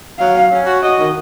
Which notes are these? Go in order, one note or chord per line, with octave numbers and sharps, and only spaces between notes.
F#3 F5
C#4
C#4
F#4
F#4 D#5
D#3